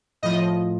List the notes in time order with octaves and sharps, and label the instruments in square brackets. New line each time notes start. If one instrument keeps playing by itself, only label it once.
[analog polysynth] A2 F3 D#5